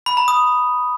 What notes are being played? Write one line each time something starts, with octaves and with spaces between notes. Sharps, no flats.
B5
A#5
D#6